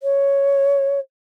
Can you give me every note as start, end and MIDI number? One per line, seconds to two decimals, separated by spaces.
0.01 0.99 73